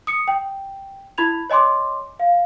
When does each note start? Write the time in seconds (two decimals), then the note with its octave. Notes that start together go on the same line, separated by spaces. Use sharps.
0.07 D#6 C#7
0.28 G5
1.18 E4 B5 G#6 F7
1.50 C#5 D#5 G#5 C6 D6
2.20 F5